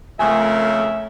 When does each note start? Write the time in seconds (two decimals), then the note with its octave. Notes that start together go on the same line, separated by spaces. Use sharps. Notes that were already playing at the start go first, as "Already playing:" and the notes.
0.19 F2 C#3 A3 A#4 E5 G#5